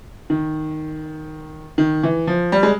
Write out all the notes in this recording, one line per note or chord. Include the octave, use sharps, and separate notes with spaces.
D#3
D#3
E3
F3
G3
G#3